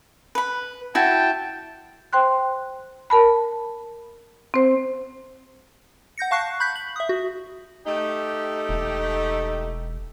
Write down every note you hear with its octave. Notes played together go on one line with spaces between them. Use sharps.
B4 B5
E4 F#4 G5 A5
C5 G5 C6 F#6
A#4 A5 B5
C4 C5
F#5 G6 A#6 C#7
F5 A5 C#6 F#6 C7
B5 F#6 G6 B6
F#7
E5 D#6
F#4
A3 D#4 G4
E1